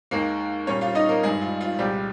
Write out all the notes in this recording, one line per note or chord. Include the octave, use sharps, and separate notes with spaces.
D#2 D#3 G#3 A#3 A#4
A#2 G3 A#3 C#4 C#5
F4 F5
D#4 D#5
A#3 A#4
G2 D#3 G3 G#3 G#4
F4
F4
C2 A#2 G3 G#3 G4